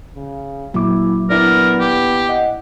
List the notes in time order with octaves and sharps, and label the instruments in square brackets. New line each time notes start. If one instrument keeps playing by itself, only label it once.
[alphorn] C#3
[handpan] A#2 [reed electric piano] F#3 D6 [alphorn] E4
[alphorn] B3 [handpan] D4 E4 D5 [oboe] A#4
[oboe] G4
[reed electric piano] D#5 F#5